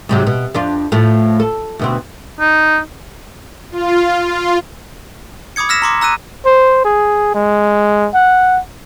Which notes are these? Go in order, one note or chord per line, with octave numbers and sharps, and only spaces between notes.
G#2 C3 F#3
B2
F2 D4 F4
A2 F3 A3
A4
D2 B2 C4
D#4
F4
F4
B5 D6 D#6 G#6 C#7
E6 F6 A#6 B6 E7
A#5 C6 D6
A#5 E6 F#6 D#7
C5
G#4
G#3
F#5